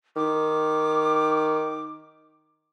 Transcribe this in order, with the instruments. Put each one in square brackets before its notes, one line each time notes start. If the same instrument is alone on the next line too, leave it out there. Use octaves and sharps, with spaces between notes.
[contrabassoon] D#3 [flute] D6